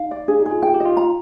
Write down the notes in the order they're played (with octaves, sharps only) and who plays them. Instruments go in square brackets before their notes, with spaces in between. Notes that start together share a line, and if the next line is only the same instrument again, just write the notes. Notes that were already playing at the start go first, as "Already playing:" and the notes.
Already playing: [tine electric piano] D#4 [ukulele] F5
[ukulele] D5
[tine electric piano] D4 [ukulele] G#4
[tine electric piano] D#4
[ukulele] G#4
[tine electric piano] F4
[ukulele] G5
[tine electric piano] G4
[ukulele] D#5
[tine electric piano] F4
[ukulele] A#5